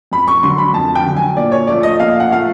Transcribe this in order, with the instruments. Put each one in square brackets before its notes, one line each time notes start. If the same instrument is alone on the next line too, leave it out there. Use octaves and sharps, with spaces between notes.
[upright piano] F2 B5
C#6
D3 F#3 C6
B5
F2 A5
G5
D3 F#3
G#5
A#2 D5
C#5
F3 A3 D5
D#5
A#2 F5
F#5
F3 A3 F5